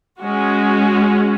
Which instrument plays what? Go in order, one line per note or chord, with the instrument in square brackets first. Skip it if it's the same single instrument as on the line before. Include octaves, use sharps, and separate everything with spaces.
[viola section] G#3 C#4 F#4